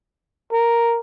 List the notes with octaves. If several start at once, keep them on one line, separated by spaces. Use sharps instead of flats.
A#4